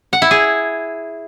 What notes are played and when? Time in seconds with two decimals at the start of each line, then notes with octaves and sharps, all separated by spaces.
0.13 F#5
0.22 E4
0.31 G#4